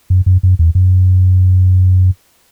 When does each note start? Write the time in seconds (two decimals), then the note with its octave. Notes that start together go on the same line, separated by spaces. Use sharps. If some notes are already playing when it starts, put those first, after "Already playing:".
0.10 F#2
0.26 F#2
0.43 F#2
0.59 E2
0.75 F#2